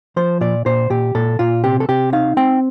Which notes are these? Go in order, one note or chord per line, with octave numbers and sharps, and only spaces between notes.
F3 C5
A#2 D5
A#2 C5
A#2 G4
A#2 A4
A#2 F4
C3 G4
A4
C3 G4
D#4 F5
C4 G5